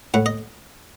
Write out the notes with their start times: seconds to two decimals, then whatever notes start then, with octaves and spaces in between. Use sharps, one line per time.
0.14 A2 F#5
0.26 D#5